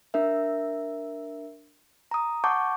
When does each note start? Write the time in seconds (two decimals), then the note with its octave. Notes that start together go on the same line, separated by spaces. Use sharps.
0.14 D4 A#4 E5
2.11 A#5 D#6
2.44 F#5 A5 C#6 D6 G6